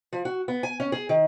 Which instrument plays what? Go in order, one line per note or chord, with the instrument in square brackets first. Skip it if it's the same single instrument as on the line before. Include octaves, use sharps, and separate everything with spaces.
[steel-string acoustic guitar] F3
F#4
B3
G#5
C#4
G#4
D#3